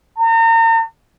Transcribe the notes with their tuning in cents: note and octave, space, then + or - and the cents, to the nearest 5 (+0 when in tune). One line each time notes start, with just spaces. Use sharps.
A#5 -40